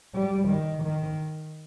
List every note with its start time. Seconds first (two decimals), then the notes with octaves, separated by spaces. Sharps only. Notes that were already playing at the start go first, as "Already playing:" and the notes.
0.15 G3
0.49 D#3
0.84 D#3